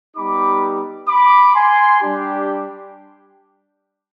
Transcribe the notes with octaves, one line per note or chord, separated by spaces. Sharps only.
G3 B3 D#4 G4 B5 D6
B5 D6
G#5 C6
G3 D4 G4